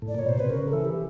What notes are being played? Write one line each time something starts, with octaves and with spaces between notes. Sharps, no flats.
A2
D5
A#2 C#5
B2 C5
C3 B4
C#3 A#4
A4
E3
G4